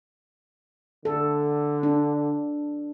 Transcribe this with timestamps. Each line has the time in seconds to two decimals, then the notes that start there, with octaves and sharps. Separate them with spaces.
1.05 D3 A4
1.83 D4